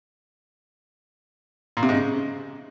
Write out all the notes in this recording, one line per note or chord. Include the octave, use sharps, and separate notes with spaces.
A#2
C3
G#2
C#3